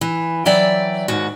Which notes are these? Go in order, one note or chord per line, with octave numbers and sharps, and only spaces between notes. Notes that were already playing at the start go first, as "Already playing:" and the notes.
E3
E3 F#3 D5 E5 G5
D#2 G#2 F#4